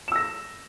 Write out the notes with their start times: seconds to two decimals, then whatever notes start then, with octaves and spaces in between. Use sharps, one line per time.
0.08 E7
0.12 E6
0.16 A#6